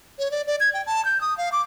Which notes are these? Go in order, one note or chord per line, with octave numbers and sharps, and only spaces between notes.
C#5
D5
D5
G#6
G5
A5
G6
D#6
F5
D6